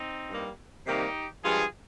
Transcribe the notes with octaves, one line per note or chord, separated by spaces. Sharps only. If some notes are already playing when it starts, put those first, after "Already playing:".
Already playing: C4 D#4
G2 G3 A#3
C3 D#3 G3 A#3 D#4 G4
G2 F3 G#3 F4 G#4